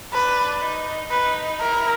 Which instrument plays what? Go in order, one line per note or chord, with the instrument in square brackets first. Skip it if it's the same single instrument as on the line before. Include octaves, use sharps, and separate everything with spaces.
[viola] D4 [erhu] B4
[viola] D#4
[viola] D#4 [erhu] B4
[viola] E4 [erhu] A#4